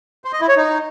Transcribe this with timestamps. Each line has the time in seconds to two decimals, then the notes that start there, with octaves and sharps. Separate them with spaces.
0.25 C5
0.33 D#5
0.41 E4
0.49 C#5
0.57 D#4